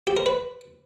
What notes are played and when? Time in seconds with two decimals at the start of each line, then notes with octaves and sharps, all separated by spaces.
0.07 G4
0.17 A#4
0.26 B4